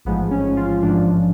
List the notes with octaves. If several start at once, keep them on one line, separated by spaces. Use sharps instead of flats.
A1 G#2 F3 G#3 B3
C#4
F4
A1 G#2 F3 G#3 D4